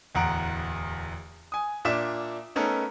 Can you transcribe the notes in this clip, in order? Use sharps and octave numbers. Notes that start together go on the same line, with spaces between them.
D1 E2 F#5 A#5 D7
G#5 D#6
A#2 D4 E5 E7
A3 B3 C#4 D#4 A4 A#4